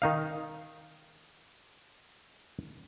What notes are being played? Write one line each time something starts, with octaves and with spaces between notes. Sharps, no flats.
D#3 D#4 F5